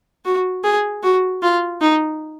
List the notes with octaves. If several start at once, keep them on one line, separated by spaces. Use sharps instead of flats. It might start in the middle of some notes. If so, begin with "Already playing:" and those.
F#4
G#4
F#4
F4
D#4